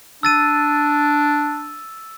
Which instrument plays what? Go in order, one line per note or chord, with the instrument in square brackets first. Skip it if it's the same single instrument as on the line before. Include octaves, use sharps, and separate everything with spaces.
[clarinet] D4 [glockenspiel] E6 A6 D#7